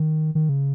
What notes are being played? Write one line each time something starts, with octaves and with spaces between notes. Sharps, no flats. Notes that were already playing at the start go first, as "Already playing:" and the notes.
Already playing: D#3
D#3
C#3